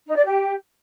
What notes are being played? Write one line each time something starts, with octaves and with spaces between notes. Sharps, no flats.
D#4
D5
G4